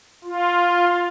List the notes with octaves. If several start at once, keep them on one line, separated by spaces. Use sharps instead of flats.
F4